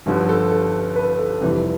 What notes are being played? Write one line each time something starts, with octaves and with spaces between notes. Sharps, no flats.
G1 G2 D3 F3
A4
A4
B4
A4
F1 F2 C3 E3 G3